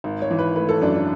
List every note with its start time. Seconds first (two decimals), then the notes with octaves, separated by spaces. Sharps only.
0.04 G#1
0.22 C#5
0.31 E3
0.39 B4
0.56 A3 B4
0.69 A4
0.81 F#2 D4
0.95 D4